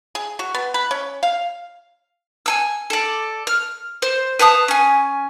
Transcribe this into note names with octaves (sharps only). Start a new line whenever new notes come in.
G#4
F#4
B3
B4
C#4
F5
G#5 A5 E6
A4 D5
F6
C5
B4 F5 A5 D#6
C#4 G#5